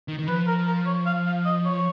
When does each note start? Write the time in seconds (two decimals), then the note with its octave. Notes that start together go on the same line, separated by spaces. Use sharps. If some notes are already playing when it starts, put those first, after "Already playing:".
0.08 D#3
0.19 D#3
0.27 F3 B4
0.47 A#4
0.66 A#4
0.86 C#5
1.06 F5
1.26 F5
1.45 D#5
1.65 C#5